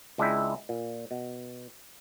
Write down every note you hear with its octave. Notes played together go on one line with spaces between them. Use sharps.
C#2 G#3 D4 E4 E5 G5
A#2
B2